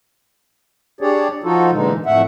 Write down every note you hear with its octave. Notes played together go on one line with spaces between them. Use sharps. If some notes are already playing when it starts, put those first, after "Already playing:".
D4 G4 G#4 C#5 D5
F3 D#4 F4 F#4 A4
A#2 D3 E3 G#3 D#4
F2 A2 A3 E5 F#5